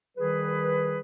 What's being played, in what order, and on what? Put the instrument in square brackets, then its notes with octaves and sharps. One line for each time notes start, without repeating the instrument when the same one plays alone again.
[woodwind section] D#3 G3 G#4 B4